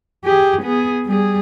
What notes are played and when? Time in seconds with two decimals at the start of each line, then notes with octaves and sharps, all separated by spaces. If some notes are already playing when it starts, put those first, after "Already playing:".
0.25 G4 G#4
0.63 B3 G#4
1.07 G3 G#4